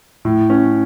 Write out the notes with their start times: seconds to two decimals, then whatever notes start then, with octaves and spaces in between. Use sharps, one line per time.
0.25 A2
0.50 C#4